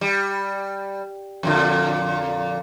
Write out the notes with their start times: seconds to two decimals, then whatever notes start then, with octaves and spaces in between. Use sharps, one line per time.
0.01 G3
1.43 F2 A#2 D3